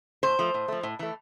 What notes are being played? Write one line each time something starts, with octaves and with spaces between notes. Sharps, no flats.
A2 C5
F3 A3
A2
F3 A3
A2
E3 A3